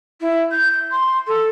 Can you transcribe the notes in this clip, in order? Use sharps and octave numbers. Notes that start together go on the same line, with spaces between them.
E4
G6
C6
A4